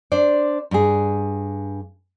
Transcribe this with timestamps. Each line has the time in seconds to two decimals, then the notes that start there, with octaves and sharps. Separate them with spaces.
0.12 D4 C5 D5
0.71 G2 G#4